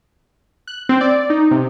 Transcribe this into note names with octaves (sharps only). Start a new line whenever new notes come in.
F#6
C4
D5
D#4
C3